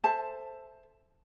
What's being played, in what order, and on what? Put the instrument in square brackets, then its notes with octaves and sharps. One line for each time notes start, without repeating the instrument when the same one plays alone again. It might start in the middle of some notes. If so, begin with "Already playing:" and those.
[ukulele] A4 C5 E5 A5